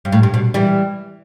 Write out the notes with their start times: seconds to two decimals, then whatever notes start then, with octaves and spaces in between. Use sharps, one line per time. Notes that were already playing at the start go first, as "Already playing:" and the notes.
0.05 G2
0.12 A2
0.23 G2
0.34 B2
0.54 E3 G3